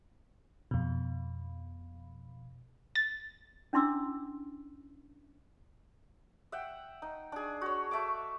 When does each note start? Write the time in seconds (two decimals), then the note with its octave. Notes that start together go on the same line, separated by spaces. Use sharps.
0.71 F2 B2
2.95 A6
3.73 C#4 D4 E4 C6 D6 E6
6.52 E5 F#5 G5
7.02 D#4
7.32 D4 G#4
7.61 F#4 C#5
7.91 A3 E5 A5 D6